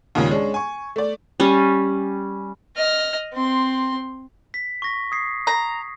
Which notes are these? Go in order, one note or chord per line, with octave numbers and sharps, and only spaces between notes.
D#2 A#2 C#3 G#3
G#3 C#4 D4
G#5 C#6
A3 D5
G3 C#4
D#5 F6
C4 C6
B6
C#6 A#6 B6
D#6 G#6 C7
A#5